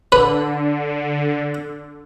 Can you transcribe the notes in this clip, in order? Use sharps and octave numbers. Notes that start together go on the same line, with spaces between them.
D3 B4